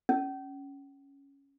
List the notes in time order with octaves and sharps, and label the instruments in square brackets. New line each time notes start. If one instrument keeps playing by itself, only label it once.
[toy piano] C#4